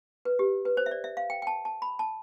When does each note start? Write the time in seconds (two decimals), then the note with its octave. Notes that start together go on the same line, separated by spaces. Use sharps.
0.25 B4
0.39 G4
0.65 B4
0.77 C5
0.86 E5
0.91 D5
1.04 E5
1.17 F5
1.30 G5
1.42 G5
1.47 A5
1.65 A5
1.82 B5
1.99 A5